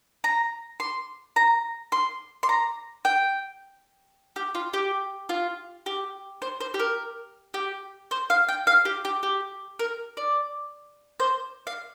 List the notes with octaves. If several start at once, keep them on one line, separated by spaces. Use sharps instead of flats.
A#5
C6
A#5
C6
C6
A#5
G5
G4
F4
G4
F4
G4
C5
C5
G4
A#4
G4
C5
F5
G5
F5
G4
G4
G4
A#4
D5
C5
F5